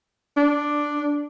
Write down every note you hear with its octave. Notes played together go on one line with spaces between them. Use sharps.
D4